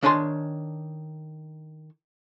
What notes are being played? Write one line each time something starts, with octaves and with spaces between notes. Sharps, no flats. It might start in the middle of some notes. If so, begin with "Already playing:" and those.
D#3 D4 C#5 G#5 A5 C6